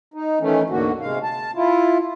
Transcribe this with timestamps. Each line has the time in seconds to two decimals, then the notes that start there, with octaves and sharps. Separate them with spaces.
0.14 D#4
0.40 D#3 E3 A3 C#4
0.70 D2 G#2 D3 A#3 F#4
1.01 C3 G#3 F5
1.23 A5
1.55 E4 F4